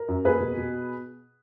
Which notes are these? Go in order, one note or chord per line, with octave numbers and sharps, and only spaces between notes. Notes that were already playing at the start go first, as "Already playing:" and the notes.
Already playing: A#4
F#2
A#3 G#4 B4
B2
B2